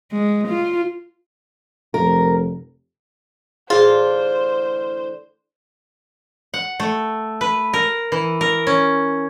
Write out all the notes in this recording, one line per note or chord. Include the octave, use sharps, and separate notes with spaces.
G#3
F4
F1 A#4
A2 D3 E3 F4 G#4 C5
F#5
A3
B4
A#4
E3
A#4
C#4